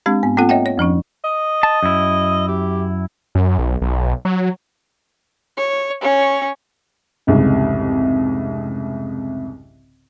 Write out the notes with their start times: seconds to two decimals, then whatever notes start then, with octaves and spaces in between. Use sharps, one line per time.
0.06 G#3 C4 D4 G4
0.23 G#2 B3
0.37 A#3 C4 F4 A4 F#5
0.49 C#5 D#5 E5 F#5 G5
0.66 C#5
0.78 F2 F3 C#4 D#4
1.24 D#5
1.63 A5
1.83 F#2 E4
2.48 G4
3.35 F#2
3.59 B1
3.81 B1
4.25 F#3
5.57 C#5
6.01 C#4 C#5
7.27 F1 C2 G#2 C#3